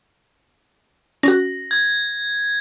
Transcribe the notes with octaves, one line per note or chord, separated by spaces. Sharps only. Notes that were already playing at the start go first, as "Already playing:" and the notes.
C#4 F#4 A#6
G#6